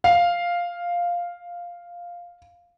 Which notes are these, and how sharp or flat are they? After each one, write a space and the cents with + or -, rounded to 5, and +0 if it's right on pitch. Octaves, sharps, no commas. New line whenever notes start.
F5 +0